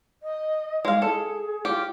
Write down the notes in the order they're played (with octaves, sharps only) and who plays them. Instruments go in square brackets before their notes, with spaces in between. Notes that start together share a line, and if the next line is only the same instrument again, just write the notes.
[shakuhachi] D#5
[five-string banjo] G#3 F5
[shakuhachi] G#4 [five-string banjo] A4
[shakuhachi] F4 [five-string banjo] G4